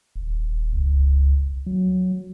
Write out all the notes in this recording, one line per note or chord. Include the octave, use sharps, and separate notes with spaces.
D#1
C#2
F#3